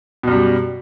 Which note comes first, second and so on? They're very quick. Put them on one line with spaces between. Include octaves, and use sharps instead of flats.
B2 F#2 G3